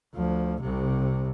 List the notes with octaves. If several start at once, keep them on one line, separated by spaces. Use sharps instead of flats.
D2 F3
C2 C3